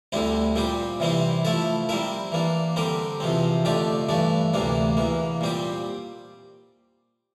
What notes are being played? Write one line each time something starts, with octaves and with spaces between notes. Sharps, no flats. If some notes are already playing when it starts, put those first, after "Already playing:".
D2 D3 G3 C4 E4
A#2 G3 C4 G4
C3 E3 G3 C4 E4
F3 A3 E4 A4 E5
G3 C4 E4 A#4 E5
E3 A#3 D4
D3 G3 C4 G4 A#4
E2 C3 F3 C4
F2 D3 A3 D4 G4
G2 E3 A3 D4 A4
D2 C3 E3 A#3 D4
E2 E3 A#3
A#2 G3 C4 G4